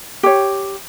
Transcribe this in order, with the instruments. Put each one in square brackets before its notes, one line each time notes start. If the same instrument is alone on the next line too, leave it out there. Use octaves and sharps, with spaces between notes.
[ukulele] G4 C#5